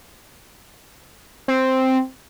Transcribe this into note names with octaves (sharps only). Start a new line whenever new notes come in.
C4